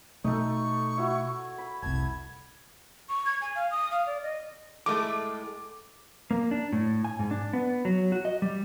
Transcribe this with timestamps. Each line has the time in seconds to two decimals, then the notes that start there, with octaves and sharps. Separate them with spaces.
0.24 B2 A3 D#4 A4 C#6
0.98 E4 F#4
1.58 B5
1.82 F1 C2 A5 G#6
3.09 C#6
3.26 G#6
3.42 G#5
3.55 F5
3.71 D#6
3.91 F5
4.06 D5
4.23 D#5
4.86 A2 G#3 A3 D6
6.31 A#3
6.51 D4
6.73 A2
7.05 G#5
7.19 G#2
7.31 D4
7.53 B3
7.85 F#3
8.12 F#4
8.25 D#5
8.42 G3